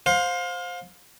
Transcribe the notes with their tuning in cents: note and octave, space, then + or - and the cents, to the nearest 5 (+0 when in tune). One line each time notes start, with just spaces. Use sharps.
C5 +0 F5 +30